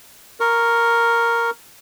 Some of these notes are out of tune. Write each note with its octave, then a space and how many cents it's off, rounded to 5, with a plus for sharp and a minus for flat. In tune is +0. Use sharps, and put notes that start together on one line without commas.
A#4 +0 C#6 +0